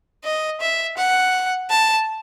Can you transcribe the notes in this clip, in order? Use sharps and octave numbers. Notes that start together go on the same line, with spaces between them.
D#5
E5
F#5
A5